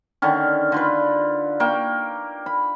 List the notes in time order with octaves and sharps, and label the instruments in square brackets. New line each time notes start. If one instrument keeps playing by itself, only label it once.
[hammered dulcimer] D3 D#3 C#4
D3 F4 B4
A#3 G5 C#6
B5